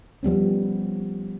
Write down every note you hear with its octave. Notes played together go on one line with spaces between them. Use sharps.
F3 G3 B3 C#4